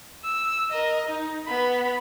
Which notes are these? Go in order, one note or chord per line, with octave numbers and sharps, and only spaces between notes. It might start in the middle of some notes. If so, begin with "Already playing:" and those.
E6
A#4 D#5
D#4
B3 B5